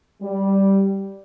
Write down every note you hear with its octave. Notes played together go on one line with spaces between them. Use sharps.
G3